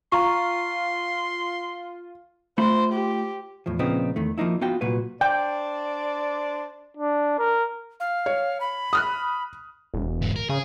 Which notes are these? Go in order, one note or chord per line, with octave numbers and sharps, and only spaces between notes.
F4 A#5 C6 C#6
A3 F4 C5 B5
G4
E2 A2 F3
A#2 C#3 F3 B3 C4 D#4
E2 D#3 A3
F3 A#3 D#4 E4
B3 D#4 F4 F#4 G5
C2 A#2 F#3 F#4 B4
D4 C5 D5 G5
D4
A#4
F5
C#5
B5
D#6 F6 F#6
E1
G#2 D3
A#4
C#3 G#4